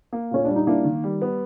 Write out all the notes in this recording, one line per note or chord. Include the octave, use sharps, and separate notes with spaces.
A#3
A#2 C#4
G3 D4
D#4
A#3 D4 E4
D#3
G3
B3